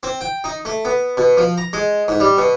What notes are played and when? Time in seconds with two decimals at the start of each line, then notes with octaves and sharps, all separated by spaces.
0.03 C4
0.21 G5
0.44 D#4
0.65 A3
0.85 B3
1.17 B2
1.37 F3
1.58 A#5
1.73 G#3
2.08 G#2
2.20 G3
2.38 B2